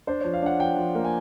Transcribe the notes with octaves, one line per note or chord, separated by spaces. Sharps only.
D4 C5
F3 C#5
F5
D4 F#5
F3 G5
F3
A#3
G#5